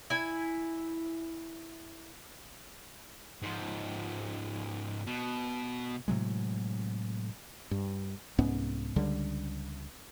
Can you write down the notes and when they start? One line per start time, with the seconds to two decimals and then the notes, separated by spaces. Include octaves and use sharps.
0.10 E4 G#5
3.42 G#2 F3
5.06 B2
6.08 A2 C3 F#3 G#3
7.71 G2
8.39 C2 G#2 B3 C#4
8.96 C#2 D3 G3